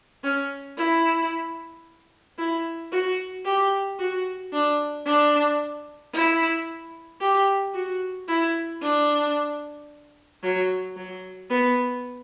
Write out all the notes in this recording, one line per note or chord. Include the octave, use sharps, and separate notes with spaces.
C#4
E4
E4
F#4
G4
F#4
D4
D4
E4
G4
F#4
E4
D4
F#3
F#3
B3